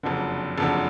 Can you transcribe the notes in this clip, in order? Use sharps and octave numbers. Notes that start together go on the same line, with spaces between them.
F#1 F2 D3
F#1 F2 D3